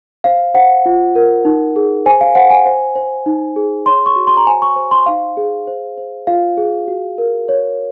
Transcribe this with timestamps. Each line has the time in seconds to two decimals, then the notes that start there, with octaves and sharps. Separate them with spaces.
0.24 C5 F5
0.54 C5 F#5
0.86 F4
1.15 A#4
1.45 D#4
1.76 G#4
2.06 C5 G#5
2.21 F5
2.35 C5 F#5
2.50 G#5
2.66 C5
2.96 C5
3.26 D#4
3.56 G#4
3.86 C#5 C6
4.06 C#6
4.16 F#4
4.27 C6
4.37 A#5
4.47 C5 G#5
4.62 C#6
4.76 C5
4.91 C6
5.06 D#4 F5
5.37 G#4
5.67 C5
5.97 C5
6.27 F4 F5
6.57 G#4
6.88 F#4
7.18 A#4
7.49 C#5